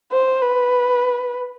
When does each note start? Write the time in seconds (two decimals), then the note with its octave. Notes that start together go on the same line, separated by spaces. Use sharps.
0.12 C5
0.41 B4